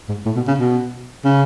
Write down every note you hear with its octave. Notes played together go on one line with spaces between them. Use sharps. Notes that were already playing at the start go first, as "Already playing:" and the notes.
G#2
A2
B2
C#3
B2
C#3